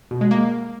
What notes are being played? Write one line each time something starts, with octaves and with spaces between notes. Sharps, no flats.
B2
G#3
A#3